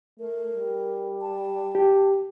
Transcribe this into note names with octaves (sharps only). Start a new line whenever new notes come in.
A3 A#4
G3
A5
G4